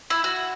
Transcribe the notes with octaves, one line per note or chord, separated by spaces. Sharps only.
E4
F#4